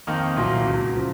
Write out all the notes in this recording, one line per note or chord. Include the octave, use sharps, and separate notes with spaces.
F2 D#3 A#3 D#4
C2 A#2 F#3 A#3
C#2 C#3 F#3
C#3 F3